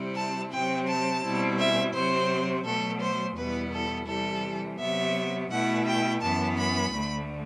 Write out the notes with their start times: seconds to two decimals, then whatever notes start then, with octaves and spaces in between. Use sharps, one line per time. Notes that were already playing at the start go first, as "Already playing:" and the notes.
Already playing: C3 G3 C4 E4
0.16 A5
0.52 C3 F#3 C4 G5
0.88 A5
1.23 B2 G3 C4 E4
1.59 E5
1.94 C3 F#3 C4 C5
2.65 B2 F#3 A3 A4
3.01 C5
3.36 E2 B2 G3 B3 E4 B4
3.73 A4
4.08 C3 E3 G3 A4
4.79 C3 F#3 B3 E5
5.51 B2 A3 E4 F#5
5.87 G5
6.21 F#2 E3 B3 A5
6.57 B5
6.93 D2 D3 A3